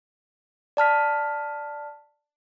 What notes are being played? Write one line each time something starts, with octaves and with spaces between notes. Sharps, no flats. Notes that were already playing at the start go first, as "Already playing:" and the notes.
D5 A5 F6 B6